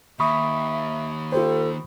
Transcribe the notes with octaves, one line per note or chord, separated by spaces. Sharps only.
D#2 E5 B5 C#6 D#6
F4 G4 A4 C5